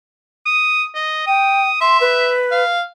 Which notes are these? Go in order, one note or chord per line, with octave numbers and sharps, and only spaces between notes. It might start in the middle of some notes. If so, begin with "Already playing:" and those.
D#6
D#5
G5 D#6
E5 C6
B4
F5